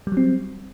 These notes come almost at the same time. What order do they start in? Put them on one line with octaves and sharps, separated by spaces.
G3 F#3 C4